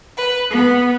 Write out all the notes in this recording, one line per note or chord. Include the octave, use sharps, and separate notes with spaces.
B4
B3